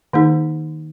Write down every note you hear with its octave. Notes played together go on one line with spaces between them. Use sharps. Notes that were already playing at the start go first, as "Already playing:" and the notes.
D#3 A#3 D#4 G#4